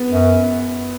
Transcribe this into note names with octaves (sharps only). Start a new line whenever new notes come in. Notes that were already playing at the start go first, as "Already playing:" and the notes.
Already playing: B3
F#2